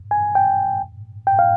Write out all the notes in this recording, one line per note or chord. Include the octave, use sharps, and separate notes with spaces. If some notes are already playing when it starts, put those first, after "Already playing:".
G#5
G5
G5
F5